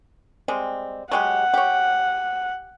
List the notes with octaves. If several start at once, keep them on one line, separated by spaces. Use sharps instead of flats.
G3 G#3 C4
F#3 G#3 G4 F#5
G4 C#5